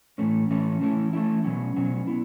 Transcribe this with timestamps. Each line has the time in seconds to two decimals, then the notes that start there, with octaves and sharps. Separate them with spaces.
0.18 A2 E3 A3 C#4
0.50 A2 E3 A3 C#4
0.81 E3 A3 C#4 E4
1.13 E3 A3 C#4 E4
1.44 B2 F#3 C#4
1.76 B2 F#3 C#4
2.07 B3 E4